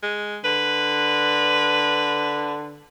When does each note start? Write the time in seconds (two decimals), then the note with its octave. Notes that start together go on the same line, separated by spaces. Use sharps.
0.03 G#3
0.44 D3 B4